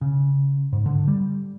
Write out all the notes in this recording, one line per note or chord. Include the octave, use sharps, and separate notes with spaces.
C#3
G#2
D3
G3